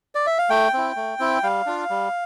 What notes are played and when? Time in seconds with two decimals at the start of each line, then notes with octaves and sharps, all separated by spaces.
0.15 D5
0.27 E5
0.38 F5
0.50 A3 G5
0.73 C4 E4
0.96 A3
1.19 C4 E4
1.43 G3 F5
1.66 D4 F4
1.90 G3